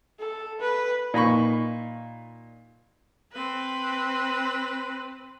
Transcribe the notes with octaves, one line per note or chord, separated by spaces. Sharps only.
A4
B4
A#2 D#4 B5 C#6
C4 B4